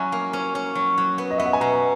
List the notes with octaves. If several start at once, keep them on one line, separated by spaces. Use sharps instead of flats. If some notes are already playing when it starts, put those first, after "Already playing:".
Already playing: F#3 C#4 E4 G#5 A#5
A#3
C#4
C#4
F#3
F#3
B3
D#5
B3 E5
F#5
G#5
B2 A#5